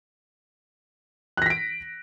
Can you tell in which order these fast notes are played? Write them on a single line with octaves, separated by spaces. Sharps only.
F#6 A#6 B6 D7